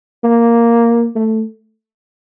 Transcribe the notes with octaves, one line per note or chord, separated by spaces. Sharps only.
A#3
A3